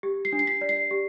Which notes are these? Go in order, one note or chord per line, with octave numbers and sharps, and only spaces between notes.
G4
C7
D4
C7
B6
D5
C7
G4